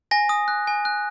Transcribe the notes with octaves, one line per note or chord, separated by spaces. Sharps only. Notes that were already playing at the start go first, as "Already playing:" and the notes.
G#5 A#6
D#6
F#6
G#5
F#6